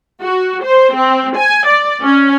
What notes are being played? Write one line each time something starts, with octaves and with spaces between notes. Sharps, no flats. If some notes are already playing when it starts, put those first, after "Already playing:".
F#4
C5
C4
G#5
D5
C#4